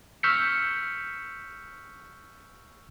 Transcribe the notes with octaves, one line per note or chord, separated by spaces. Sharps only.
C#6 E6 F6 G6 B6 C#7